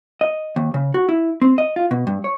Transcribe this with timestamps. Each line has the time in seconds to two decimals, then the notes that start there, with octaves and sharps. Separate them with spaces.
0.21 D#5
0.56 D#2
0.74 C#3
0.94 F#4
1.09 E4
1.42 C4
1.58 D#5
1.76 F4
1.91 B2
2.07 G2
2.24 C#5